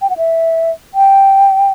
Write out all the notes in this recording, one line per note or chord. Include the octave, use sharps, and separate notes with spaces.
G5
F#5
E5
G5